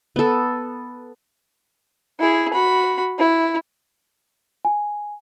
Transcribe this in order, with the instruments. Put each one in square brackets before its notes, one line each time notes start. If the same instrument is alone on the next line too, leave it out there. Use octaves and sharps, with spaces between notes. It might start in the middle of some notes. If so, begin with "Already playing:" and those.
[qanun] B3 A4
[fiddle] E4 G#4
F#4 B5
E4
[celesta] G#5